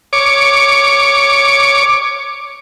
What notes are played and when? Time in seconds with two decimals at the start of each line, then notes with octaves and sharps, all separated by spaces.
0.13 C#5 D6